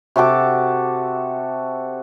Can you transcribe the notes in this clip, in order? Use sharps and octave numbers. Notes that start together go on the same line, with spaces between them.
C3 F#4 A4 D6